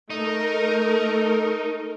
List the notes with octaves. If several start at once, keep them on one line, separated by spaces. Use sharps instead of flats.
A3 D#4 A#4